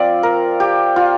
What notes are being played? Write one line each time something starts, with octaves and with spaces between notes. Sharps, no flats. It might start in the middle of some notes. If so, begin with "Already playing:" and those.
Already playing: F3 C4 F4 D5
A#4
G4
F4